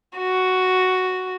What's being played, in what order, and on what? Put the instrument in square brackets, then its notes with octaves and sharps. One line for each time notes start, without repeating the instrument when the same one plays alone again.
[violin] F#4